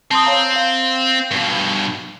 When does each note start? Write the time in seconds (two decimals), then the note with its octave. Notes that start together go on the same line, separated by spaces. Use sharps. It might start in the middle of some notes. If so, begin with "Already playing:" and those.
0.11 C4 A5 C6 D#6
0.25 C#5 F5 A#5
0.53 F5 F#7
1.31 G2 B2